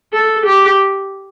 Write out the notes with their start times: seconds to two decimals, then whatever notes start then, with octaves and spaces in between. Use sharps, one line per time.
0.13 A4
0.46 G4